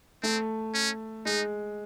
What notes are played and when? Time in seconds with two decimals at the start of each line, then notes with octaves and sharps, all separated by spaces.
0.23 A3 C4
0.74 C#4
1.25 G#3 D#4